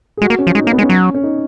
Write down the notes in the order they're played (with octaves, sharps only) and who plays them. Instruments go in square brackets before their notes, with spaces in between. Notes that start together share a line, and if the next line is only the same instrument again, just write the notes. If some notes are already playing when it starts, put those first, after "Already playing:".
[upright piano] G#4
[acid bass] G#3 [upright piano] F#4
[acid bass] A#3
[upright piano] C#4
[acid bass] F3
[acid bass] G#3 [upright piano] D#4
[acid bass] A#3 [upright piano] C#4
[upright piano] B3
[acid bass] G#3
[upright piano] C#4
[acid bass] F#3
[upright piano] C#4
D#4